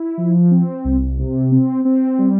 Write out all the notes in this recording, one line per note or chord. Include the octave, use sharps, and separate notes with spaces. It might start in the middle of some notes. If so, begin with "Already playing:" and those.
Already playing: E4
F3
C4
C2
C3
C4
C4
G3